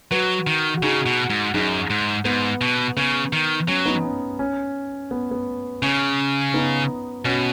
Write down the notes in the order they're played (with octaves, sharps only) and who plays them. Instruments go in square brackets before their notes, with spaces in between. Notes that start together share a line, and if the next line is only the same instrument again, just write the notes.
[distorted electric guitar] F#3 [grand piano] F#4 B4
[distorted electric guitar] D#3
[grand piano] F#4
[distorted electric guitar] C#3 [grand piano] D#4 G#4
[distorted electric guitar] B2
G#2
[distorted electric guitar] F#2 [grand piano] D#4 G#4
[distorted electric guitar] G#2
[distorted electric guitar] G#2 [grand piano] B3
[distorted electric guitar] B2
[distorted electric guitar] C#3 [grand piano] B3
[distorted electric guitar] D#3
[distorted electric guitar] F#3 [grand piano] C#4
[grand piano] B3 D#4
C#4
C#4
B3
B3
[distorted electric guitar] C#3 [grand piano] C#4
[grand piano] B3 D#4
[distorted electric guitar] B2 [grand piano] C#4 F#4